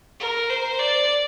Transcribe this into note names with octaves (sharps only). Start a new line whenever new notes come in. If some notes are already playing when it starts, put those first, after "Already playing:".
A#4
C5
D5